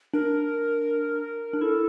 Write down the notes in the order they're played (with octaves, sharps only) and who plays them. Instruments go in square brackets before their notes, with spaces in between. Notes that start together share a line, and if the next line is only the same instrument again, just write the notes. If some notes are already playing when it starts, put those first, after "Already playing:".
[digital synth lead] D4 [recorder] A#4
[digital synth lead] D4
[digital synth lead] E4 [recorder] A4